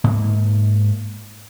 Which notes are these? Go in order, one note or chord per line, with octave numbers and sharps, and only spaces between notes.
G#2 A#3